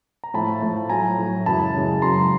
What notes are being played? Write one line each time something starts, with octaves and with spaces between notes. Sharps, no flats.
A#5
A2 F3 A3 A5 B5
A2 F3 A3
A2 F#3 A3 G#5 A#5
A2 F#3 A3
F#2 C#3 E3 G#3 A5 B5
F#2 C#3 E3 G#3
F#2 C#3 F#3 A#5 C6